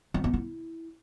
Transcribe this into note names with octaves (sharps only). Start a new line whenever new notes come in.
C4
B3
E4